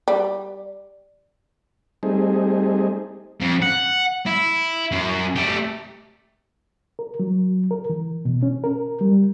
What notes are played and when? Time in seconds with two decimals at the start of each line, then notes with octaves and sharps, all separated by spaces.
0.08 G3
2.03 G3 A3 C4 D#4 G#4
3.40 F2
3.62 F#5
4.26 E4
4.92 F#2
5.36 A3 G4
6.99 A#4
7.20 F#3
7.71 A#4
7.90 E3
8.25 B2
8.43 C#4
8.64 A#4
9.01 G3